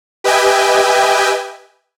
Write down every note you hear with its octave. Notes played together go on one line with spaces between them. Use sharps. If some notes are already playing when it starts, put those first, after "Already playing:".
G4 B4 D#5 E5 G5 G#5